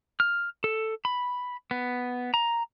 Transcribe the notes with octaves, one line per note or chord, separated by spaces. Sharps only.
F6
A4
B5
B3
A#5